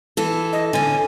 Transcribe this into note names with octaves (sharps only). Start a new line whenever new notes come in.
E3 A4
D#5
D3 C#4 G#5